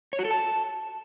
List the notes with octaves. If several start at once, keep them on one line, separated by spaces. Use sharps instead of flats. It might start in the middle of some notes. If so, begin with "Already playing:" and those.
C#5
F#4
A4
A5